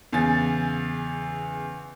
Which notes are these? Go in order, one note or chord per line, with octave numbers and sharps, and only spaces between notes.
E2 C#3 G#5 A6